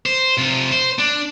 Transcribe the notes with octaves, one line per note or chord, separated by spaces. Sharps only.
C5
C3 F4
C5
D4